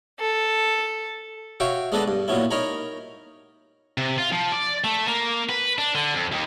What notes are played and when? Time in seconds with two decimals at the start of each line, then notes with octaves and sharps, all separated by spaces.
0.20 A4
1.60 F#4 C#5 E5 F5 G5
1.92 G#3 B3 D4 A4 B4 D#5
2.08 G2
2.28 A#2 F#3 B3 C#4 E4
2.51 D#4 A#4 C#5 A#5 B5
3.98 C3
4.18 F4
4.32 F3
4.52 D5
4.84 A3
5.08 A#3
5.50 B4
5.78 D4
5.95 D3
6.14 F2
6.32 D#2